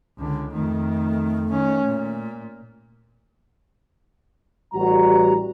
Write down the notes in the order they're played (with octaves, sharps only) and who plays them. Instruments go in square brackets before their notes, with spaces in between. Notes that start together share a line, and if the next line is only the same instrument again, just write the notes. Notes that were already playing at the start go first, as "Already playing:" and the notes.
[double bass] C#2 D3
[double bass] F2 D#3 [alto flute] A3
[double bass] D#3 C#4
A#2
[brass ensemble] A1 G3 F#4 A#5